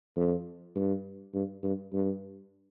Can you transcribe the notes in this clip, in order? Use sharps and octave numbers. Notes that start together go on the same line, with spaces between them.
F2
G2
G2
G2
G2